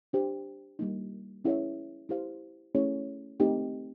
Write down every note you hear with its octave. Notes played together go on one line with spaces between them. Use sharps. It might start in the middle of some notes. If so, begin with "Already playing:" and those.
D4 G4 C5
G3 A#3 D#4
C#4 E4 G#4 C#5 E5
E4 G4 C5 F5
A3 C#4 E4 G#4 C#5
A3 C4 D#4 G4